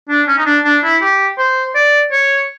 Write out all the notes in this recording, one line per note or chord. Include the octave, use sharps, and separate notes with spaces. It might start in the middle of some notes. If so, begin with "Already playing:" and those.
D4
C#4
D#4
D4
D4
E4
G4
C5
D5
C#5